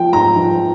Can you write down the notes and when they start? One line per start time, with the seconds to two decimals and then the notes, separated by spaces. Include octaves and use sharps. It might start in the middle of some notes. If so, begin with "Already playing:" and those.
Already playing: F3 G5
0.12 G#2 A#5
0.36 F3